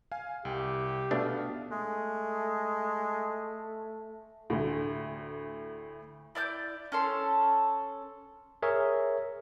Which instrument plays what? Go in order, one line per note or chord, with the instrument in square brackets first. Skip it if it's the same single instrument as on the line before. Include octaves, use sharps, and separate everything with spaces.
[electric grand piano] F5 G#5
[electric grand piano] C2 [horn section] G4
[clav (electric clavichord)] B2 A3 D4 [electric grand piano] B3 F5
[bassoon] G#3 [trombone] A3
[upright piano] D2 A2
[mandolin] E4 D5 E6 G6
C#4 A4 C6
[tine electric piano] G#4 A#4 C#5 E5